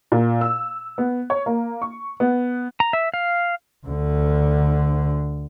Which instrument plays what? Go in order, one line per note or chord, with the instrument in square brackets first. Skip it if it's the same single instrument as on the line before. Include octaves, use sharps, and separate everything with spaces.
[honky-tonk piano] A#2
E6
B3
C#5
A#3
C#6
B3
[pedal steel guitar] A#5
E5
F5
[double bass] D2 D3